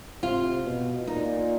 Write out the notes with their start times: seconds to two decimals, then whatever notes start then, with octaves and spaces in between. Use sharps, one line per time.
0.23 C3 F4
0.65 B2
1.07 A#2 D#4